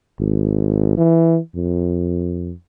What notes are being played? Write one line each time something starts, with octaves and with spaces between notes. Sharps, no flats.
G#1
E3
F2